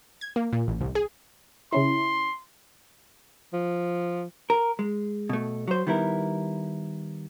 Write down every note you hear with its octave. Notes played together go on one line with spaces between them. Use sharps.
G#6
A#3
A#2
A1
C2
G#4
C#3 C#4 E4 C6
F3
A#4
G#3
B2 A3
F#3 C5
D#3 G3 B3 E4 A#4